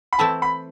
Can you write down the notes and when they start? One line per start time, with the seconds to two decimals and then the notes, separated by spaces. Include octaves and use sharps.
0.13 B5
0.19 E3 A3 C4 E4 A5
0.42 B5